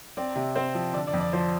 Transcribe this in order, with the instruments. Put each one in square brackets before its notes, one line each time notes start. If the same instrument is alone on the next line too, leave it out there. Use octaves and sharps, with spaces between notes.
[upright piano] C4 D5
C3
C4 C5
F3
D3 D5
D5
F2
D5
F3 C5